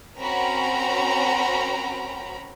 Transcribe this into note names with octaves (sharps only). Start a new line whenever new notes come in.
C4 C#4 F#4 A#4 A#5 B5